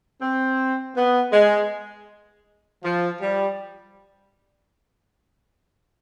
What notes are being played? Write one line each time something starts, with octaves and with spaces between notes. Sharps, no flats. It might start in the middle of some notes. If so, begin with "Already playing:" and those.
C4
B3
G#3
F3
G3